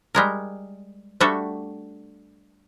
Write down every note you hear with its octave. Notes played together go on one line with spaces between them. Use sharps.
G3 G#3 A#4
G3 A3 D4 F#4 A4